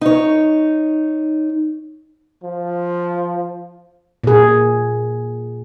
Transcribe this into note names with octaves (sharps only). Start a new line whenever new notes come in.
D#4 C#5
F3
A#2 G#4